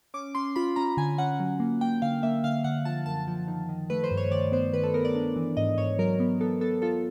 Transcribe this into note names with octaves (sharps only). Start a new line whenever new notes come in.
C#4 D6
C#4 C6
F4 B5
C#4 A#5
D3 G#5
C#4 F#5
F#3
A#3
A#3 G5
D3 F5
A#3 E5
D3 F5
D3 F#5
F3 A5
F#2 A5
F3
D#3
D#3
A3 B4
C5
G2
C#5
D#3 D5
B3 C5
D#3 B4
A4
B3 A#4
D5
D4
E3
G#2 D#5
G#2 C#5
F#3 A#4
B3
B3 A4
B3 A4
F4 A4